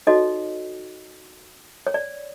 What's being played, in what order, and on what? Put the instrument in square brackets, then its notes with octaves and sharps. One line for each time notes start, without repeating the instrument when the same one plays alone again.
[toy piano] D#4 F#4 A4 C#5 D#5
C#5
D5